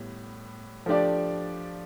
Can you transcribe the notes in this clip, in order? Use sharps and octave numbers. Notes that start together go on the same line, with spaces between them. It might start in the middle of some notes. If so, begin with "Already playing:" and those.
Already playing: A2 G3 B3
F3 A3 D4 G4 D5